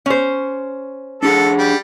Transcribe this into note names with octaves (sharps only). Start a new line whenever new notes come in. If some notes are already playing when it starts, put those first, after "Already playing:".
C#4 C5
D4 G#4 A4 F#5
G3